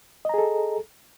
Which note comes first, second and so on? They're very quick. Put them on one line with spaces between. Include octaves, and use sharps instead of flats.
D#5 A#5 G#4 A4